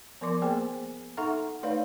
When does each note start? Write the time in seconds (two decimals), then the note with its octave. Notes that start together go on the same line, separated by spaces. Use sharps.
0.21 F3 B3 A#4 D5 C6 D6
0.42 A#3 B3 G#4 C5 G5 G#5
1.17 D#4 A4 E5 F#5 A#5 C#6
1.63 A3 D#4 B4 C#5 D5 F5